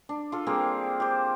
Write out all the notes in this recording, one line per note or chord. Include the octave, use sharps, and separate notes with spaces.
D4
F4 A4
G3 A#3 C4 G#4
G4 C5